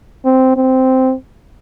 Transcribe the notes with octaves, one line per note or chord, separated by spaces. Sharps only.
C4
C4